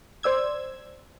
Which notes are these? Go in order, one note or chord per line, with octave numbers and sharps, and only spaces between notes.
C5 D5 E6 G#6